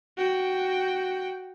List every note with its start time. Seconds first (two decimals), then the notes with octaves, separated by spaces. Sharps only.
0.17 F#4 G5